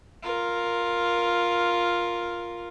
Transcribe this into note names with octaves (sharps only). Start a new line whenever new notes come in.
F4 A#4